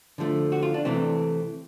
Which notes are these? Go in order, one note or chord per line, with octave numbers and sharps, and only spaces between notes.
D3 F3 A3
F#4
F4
D4
C3 E3 A3 C4